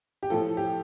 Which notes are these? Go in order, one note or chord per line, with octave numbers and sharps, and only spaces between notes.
G4
A2 F3 A4
G4